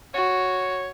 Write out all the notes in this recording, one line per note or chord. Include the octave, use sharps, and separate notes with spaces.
F#4 C#5